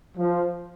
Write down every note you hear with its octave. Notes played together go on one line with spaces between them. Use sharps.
F3